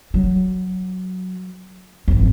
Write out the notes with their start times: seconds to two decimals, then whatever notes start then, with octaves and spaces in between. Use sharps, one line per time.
0.14 F#3
2.08 G#1 F2